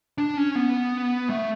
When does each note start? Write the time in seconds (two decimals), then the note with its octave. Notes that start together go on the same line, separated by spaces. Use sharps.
0.18 D4
0.37 C#4
0.55 B3
1.29 A3